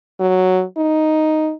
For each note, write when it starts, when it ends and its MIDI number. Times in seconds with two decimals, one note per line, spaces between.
0.20 0.63 54
0.77 1.53 63